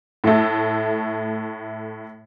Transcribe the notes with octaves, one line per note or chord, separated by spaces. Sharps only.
A2 A3